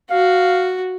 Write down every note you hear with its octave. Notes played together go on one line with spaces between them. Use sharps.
F#4 F5